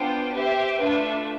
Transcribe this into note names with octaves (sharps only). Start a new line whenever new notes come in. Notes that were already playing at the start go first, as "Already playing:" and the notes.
Already playing: B3 D4 F4 C5 G5
G4 C5 E5 G5
A3 D4 F4 B4 E5